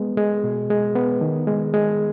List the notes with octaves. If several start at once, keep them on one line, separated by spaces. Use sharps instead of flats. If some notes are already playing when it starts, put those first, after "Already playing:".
Already playing: G#3 B3
G#3
B2
G#3
B3
D#3
G#3
G#3